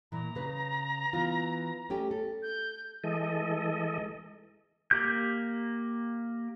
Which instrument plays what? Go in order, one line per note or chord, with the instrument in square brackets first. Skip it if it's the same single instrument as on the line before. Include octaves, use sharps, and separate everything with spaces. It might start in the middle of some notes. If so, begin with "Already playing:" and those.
[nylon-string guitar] A#2 E3 [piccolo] A#5
[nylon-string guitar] C#3 B4
E3 B3 F4
A3 C#4 G4
A4
[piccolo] G6
[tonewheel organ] E3 G#3 A4 D#5
[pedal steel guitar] A#3 G4 G6